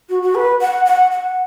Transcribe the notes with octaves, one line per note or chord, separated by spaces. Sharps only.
F#4
F#4
B4
F#5
F#5
F#5